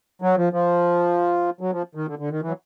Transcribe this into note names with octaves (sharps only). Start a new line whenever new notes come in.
F#3
F3
F3
F#3
F3
D#3
D3
D3
D#3
E3
F#3